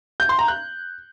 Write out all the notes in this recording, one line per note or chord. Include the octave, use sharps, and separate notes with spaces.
G6
C6
A#5
F#6